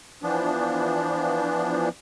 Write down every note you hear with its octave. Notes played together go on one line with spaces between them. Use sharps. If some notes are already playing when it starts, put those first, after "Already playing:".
E3 F3 B3 D4